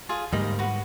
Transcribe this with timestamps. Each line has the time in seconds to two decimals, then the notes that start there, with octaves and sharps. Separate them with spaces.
0.09 F4 G#4 A4
0.33 D2 G#2 G3 A#3 D#5
0.59 F#4 B4